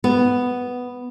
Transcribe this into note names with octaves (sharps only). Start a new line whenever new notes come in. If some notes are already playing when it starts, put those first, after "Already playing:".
B3